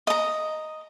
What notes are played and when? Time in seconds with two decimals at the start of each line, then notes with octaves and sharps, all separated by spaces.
0.07 D#5 A#5